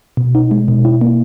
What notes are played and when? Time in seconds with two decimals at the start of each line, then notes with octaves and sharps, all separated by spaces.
0.17 B2
0.35 D#4
0.51 G#3
0.68 B2
0.85 E4
1.01 A#3